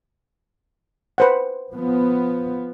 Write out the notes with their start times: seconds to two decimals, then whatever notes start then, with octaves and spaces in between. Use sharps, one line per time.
1.18 B4 C5 F#5
1.73 F3 B3